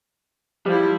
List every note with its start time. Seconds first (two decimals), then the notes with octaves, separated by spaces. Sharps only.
0.66 F3 G3 E4